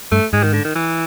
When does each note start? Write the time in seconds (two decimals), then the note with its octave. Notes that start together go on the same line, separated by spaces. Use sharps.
0.11 G2 A3
0.33 G#2 G#3
0.43 D#3
0.53 D3
0.64 D#3
0.75 E3